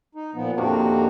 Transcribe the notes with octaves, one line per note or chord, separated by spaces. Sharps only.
D#4
A#2 F3 B3
F2 C3 D#3 A#3 D4 F#4